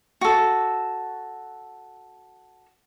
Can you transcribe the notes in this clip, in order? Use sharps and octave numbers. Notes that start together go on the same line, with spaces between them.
F#4 A4